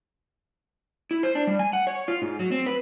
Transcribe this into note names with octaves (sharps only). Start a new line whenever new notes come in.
E4
C5
D4
G3
G#5
F#5
C#5
F4
G#2
F#3
C4
B4